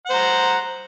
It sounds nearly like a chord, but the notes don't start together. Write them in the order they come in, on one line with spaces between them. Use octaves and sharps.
F#5 C5 A#5